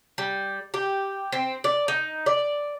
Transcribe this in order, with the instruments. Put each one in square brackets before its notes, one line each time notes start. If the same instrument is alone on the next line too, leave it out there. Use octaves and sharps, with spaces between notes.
[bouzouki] G3
G4
C4
D5
D#4
D5